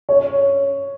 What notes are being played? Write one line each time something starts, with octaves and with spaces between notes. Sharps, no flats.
C#5